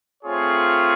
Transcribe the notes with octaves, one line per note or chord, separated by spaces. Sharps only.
A3 C4 F4 G#4 C#5